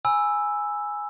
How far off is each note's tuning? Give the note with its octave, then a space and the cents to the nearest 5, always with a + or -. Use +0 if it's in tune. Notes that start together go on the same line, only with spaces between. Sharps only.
G#5 +0 B5 +0 E6 +0